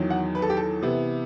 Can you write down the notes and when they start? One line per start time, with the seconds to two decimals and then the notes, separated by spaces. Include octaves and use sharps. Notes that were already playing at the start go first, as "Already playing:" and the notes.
Already playing: E2 D#3 F#3
0.10 F#5
0.35 B4
0.42 A4
0.50 G4
0.57 A4
0.82 C3 E3 B3